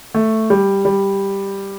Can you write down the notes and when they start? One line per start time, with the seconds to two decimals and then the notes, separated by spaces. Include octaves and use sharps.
0.15 A3
0.50 G3
0.85 G3